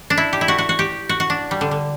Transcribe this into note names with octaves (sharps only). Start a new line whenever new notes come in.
D4
E4
G4
E4
F#4
F#4
F#4
G4
F#4
F#4
D4
G3
D3
D3